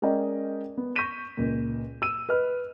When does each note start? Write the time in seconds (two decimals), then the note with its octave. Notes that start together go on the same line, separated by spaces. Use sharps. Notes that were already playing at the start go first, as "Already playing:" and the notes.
0.02 G#3 C#4 A#4 D5 D#5 G5
0.77 B3
0.96 C#6 G6 A#6 B6 D#7 E7
1.37 C#2 A#2
2.02 E6 D#7
2.29 B4 D#5 F6